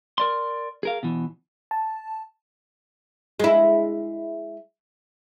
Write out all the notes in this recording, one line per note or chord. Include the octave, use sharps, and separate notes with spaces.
A#4 D5 C6
G#4 A#4 F5
B2 E3
A5
G#3 E4